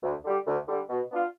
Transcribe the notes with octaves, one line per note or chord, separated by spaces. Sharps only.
D2
D3 G3
D2
D3 G3
B2
B3 D4 F4